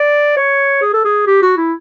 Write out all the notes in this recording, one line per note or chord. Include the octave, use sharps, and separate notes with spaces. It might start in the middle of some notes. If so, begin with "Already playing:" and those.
Already playing: D5
C#5
G#4
A4
G#4
G4
F#4
E4